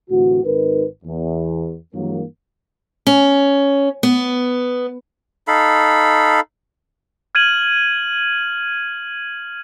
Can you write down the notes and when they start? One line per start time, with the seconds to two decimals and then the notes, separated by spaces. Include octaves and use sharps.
0.11 D2 A2 C3 E3 F#4
0.44 G#1 D#4 A#4 B4
1.05 E2
1.95 G2 E3 F#3 G#3 A#3
3.07 C#4
4.03 B3
5.48 D#4 A4 F5 B5
7.35 F6 G#6 D#7 F#7